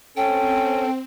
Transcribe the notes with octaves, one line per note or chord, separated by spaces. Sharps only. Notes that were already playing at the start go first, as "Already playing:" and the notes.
C4 C#4 A4 G5